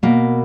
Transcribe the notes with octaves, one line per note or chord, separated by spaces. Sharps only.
B2 A#3